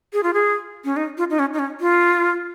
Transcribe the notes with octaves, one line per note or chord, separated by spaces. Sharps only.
G#4
F4
G#4
C#4
D#4
F4
D#4
C#4
D#4
C#4
F4